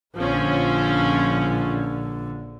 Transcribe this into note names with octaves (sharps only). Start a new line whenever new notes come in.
A#1 D3 F3 C#4